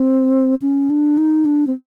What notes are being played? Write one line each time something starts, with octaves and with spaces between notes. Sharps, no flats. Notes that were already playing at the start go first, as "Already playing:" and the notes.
Already playing: C4
C#4
D4
D#4
D4
C4